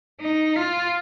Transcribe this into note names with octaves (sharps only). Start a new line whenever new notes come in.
D#4
F4